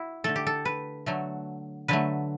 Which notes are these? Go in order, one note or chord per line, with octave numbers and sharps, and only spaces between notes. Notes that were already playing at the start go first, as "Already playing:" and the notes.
Already playing: E4 F#4
D3 A3 A4
G4
A4
B4
D3 F#3 A3
D3 F#3 A3 B4